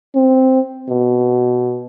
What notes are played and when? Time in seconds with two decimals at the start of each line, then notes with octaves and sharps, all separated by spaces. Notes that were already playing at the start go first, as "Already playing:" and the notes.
0.15 C4
0.89 B2